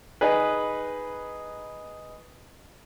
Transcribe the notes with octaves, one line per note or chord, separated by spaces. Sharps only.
D#4 G#4 B4